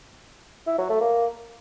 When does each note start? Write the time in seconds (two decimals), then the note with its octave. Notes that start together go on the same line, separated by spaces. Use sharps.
0.67 E4
0.78 F#3
0.89 A3
1.00 A#3